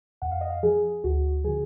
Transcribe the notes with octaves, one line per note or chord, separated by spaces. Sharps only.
F2 F#5
F5
D#5
F5
F3 G#4
D2 F#4
D3 F3 G#4